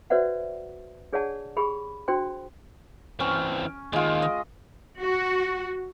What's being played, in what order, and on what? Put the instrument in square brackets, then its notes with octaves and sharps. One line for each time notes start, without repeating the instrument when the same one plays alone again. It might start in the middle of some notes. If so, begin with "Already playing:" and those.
[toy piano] F#4 B4 C5 D5 E5 F#5
D4 G#4 C#5 D5 F#5 A5
G4 G#4 B5 C#6
D4 F#4 C5 G5 C6
[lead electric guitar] E3 C4 [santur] C#4
[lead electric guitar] D#2 D#3 [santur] G#3 F4
[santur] D#5
[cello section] F#4